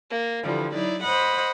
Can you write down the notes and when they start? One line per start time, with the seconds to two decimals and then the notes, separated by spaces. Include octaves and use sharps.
0.11 A#3
0.44 D3 E3 F3 G3
0.73 F#3 D#4 E4 D5
1.02 C5 D#5 F#5 B5